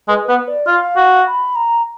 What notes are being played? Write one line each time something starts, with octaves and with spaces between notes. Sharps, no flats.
G#3 B4
B3 B4
D5
F4 F5
F#4
B5
A#5